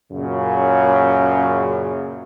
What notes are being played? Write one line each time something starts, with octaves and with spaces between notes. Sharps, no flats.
F#2 A#2 C#3